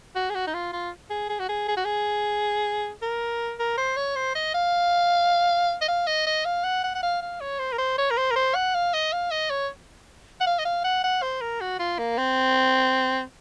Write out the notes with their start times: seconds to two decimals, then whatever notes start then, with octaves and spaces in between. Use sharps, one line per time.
0.16 F#4
0.30 G#4
0.35 F#4
0.47 D#4
0.54 F4
0.73 F4
1.10 G#4
1.30 G#4
1.39 F#4
1.49 G#4
1.68 G#4
1.77 F#4
1.85 G#4
3.02 A#4
3.59 A#4
3.77 C5
3.97 C#5
4.16 C5
4.35 D#5
4.54 F5
5.82 D#5
5.88 F5
6.07 D#5
6.27 D#5
6.45 F5
6.64 F#5
6.84 F#5
6.95 F#5
7.03 F5
7.22 F5
7.41 C#5
7.59 C5
7.72 A#4
7.78 C5
7.98 C#5
8.10 A#4
8.17 C5
8.31 A#4
8.36 C5
8.55 F#5
8.75 F5
8.93 D#5
9.13 F5
9.31 D#5
9.50 C#5
10.41 F#5
10.46 F5
10.59 D#5
10.65 F5
10.84 F#5
11.04 F#5
11.22 C5
11.41 A#4
11.61 F#4
11.79 F4
11.98 A#3
12.18 C4